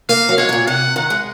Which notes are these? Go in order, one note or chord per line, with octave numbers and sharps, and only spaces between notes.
A#3 F5
F#3
G#3 C#5
G#2
A#2
C3 F#5
D#3 F#5
G#3